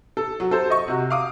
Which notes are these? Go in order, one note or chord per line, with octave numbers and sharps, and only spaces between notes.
A4
F#3
A4 C5
D#5 C#6
C3 F#4
F5 D6 D#6